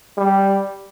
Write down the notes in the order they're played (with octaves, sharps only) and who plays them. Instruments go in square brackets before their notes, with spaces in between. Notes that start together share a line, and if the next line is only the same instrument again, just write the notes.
[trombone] G3